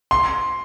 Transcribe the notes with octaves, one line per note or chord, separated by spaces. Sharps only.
C6